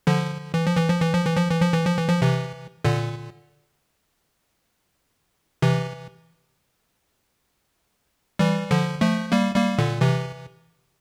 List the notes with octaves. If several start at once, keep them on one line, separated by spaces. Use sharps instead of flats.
D3 F3
E3
F3
E3
F3
E3
F3
E3
F3
E3
F3
E3
F3
E3
F3
C3 E3
A#2 D3
C3 E3
E3 G3
D3 F3
F3 A3
G3 A#3
G3 A#3
A#2 D3
C3 E3